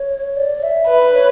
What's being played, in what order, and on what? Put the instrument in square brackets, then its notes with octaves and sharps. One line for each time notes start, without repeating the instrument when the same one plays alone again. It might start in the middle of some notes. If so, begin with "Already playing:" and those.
Already playing: [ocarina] C#5
D5
E5
[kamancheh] B4
[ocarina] C#5